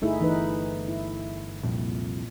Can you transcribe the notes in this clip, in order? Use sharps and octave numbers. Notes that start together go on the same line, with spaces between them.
G1 A3 D#4 E4 G#4
E3 D#4 B4
E4
C2 F2 A#2